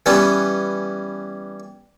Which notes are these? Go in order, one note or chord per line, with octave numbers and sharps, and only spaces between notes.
E3 G3 B3 C#4